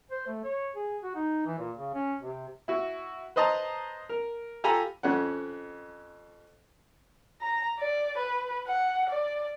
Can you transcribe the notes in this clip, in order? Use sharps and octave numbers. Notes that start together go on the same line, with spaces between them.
C5
A3
C#5
G#4
F#4
D#4
E3
A#2
C#3
C#4
C3
E4 F#4
B4 C5 D#5 A5 A#5
A#4
F4 G4 A4 G#5 A#5 B5
F2 C#4 F#5
A#5
D5
B4
F#5
D5